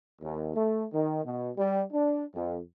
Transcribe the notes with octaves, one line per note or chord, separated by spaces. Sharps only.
D#2
A3
D#3
B2
G3
D4
F2